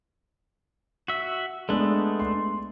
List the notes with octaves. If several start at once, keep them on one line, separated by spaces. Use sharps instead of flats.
F#4 E5
G#3 A3 B3 D4
C6